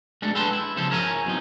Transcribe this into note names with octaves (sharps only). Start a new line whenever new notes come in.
G#3 A3 D4 F#4 A4
A4 B4 G5 A5 C6
E4
C#3 F3 A4 C5
E4 A#4 C#5 D#5 G#5
F#3 C4 D#4